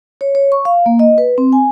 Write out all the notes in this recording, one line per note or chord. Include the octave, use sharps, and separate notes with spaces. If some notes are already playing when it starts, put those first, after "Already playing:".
C#5
C#5
C#6
F5
A#3
D#5
B4
C4
G#5